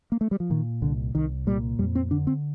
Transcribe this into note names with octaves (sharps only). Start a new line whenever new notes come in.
A#3
A3
G3
F3
A#2 D#3
C2 D3
C2 D#3
A#2 G3
F2 G3
C4
D3 D4
C4